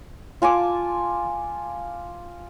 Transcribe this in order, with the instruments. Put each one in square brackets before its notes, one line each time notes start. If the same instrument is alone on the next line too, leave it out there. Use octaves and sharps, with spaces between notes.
[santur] F4 G#5 A5 D6